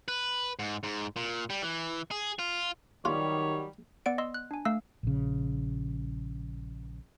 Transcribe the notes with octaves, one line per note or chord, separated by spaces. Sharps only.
B4
G#2
G#2
A#2
G3
E3
G#4
F4
D#3 F#3 G3 F4 C#5
B3 D5 F#5 D7
D#5 C6 E6
F#6
D4 G#5
A3 F5 E6
A#1 C#3